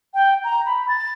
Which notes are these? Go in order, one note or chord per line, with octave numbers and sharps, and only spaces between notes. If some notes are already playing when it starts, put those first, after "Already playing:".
G5
A#5
B5
A6